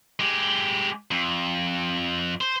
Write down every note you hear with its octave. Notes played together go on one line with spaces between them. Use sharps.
G#3 G4
F2
C5